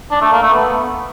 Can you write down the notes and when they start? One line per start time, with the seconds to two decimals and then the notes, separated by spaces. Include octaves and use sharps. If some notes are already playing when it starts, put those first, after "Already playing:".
0.11 D4
0.22 A3
0.32 A#3
0.43 A3
0.53 B3